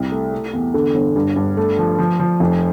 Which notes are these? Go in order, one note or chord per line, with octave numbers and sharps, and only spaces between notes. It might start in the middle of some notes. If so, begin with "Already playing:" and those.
Already playing: C2
A3
A3
E2
D3
G1
G2
G2
A3
F3
F3
F3
F1